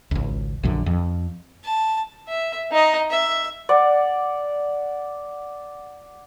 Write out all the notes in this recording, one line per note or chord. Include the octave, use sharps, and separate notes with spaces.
G#1 C#2
A#1 F#2 D3
F2
A5
E5
D#4 D#5
E5
D5 F#5